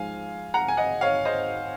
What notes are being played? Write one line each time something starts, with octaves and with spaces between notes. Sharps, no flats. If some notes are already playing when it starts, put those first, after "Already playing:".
Already playing: G#2 F3 G#3 F5 G#5
F#5 A#5
G#5
D#5 F#5
C#5 F5
C5 D#5